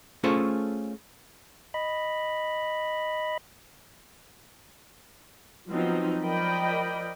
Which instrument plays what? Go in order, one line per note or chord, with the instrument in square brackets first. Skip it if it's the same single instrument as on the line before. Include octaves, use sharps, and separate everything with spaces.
[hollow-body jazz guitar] A3 C#4 F4 G#4 A4 C5
[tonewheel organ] D#5 B5
[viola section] F3 F#3 B3 C4 D#4
F3 A#4 D5 D#5 G5 B5